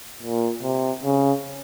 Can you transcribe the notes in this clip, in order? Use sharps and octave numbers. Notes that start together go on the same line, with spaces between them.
A#2
C3
C#3